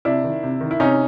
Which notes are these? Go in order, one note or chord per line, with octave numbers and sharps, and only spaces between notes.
C3 D4 E4
D#3
C3
D#3
E4
C3 C#4 D#4